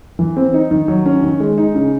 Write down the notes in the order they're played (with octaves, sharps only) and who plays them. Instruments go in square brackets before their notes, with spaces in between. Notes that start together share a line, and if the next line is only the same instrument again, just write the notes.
[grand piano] E3
C4
D#4
D#3
F#3
C#4
D#3
G#3
D#4
C#3